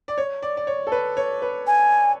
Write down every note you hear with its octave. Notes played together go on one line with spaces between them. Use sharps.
D5
C#5
D5
D5
C#5
A4
B4
C#5
B4
G#5